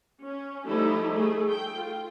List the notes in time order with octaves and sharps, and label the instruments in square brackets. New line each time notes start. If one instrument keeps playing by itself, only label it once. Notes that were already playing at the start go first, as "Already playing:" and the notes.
[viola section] C#4
F3 G3 A3 D#4 E4
A3 G#4
G5
F4